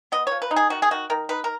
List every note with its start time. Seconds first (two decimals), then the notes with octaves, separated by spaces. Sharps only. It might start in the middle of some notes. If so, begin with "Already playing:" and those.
0.12 B3 D#5
0.27 F3 C#5
0.42 B4
0.51 D#4
0.56 G#4
0.70 D#3 F#4
0.82 G#4
0.91 D#3 F#4
1.10 D#3 A#4
1.29 D#4 B4
1.44 A#4